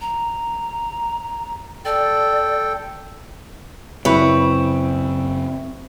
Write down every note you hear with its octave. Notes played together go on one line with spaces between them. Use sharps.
A#5
A4 D5 G5
F#2 C#3 C4 E4 B4 C#5